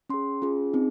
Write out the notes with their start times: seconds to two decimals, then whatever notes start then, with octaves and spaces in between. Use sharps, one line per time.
0.10 C#4 G#4 C6
0.42 C#4 F4 G#4
0.73 C4 D#4 G#4